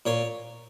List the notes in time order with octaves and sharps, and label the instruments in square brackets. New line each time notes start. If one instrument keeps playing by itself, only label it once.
[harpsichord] A#2 C#5